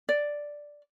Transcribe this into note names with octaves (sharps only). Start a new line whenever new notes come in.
D5